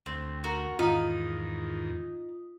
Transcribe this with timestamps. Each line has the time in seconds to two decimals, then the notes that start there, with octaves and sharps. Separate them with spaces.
0.06 D2 C4
0.44 F#4 A#4
0.79 E2 G#2 D#3 D#4 F4 D#6